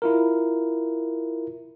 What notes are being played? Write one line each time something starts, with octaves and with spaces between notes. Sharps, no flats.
E4 F4 A#4